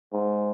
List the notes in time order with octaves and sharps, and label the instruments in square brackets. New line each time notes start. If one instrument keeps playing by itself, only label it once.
[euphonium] G#2